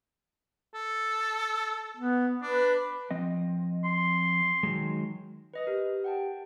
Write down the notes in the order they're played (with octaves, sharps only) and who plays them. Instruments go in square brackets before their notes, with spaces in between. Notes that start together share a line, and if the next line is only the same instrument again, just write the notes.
[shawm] A4
[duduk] B3
[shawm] D4 [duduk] B4
[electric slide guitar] F3 C4 D#5
[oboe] C6
[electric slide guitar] D#3 F#3 G#3
[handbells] B4 D#5 D#6
[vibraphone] G4 [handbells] A#4
[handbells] F#5 G5 A5